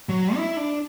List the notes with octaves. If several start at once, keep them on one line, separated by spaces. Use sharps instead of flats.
F#3
E4
D4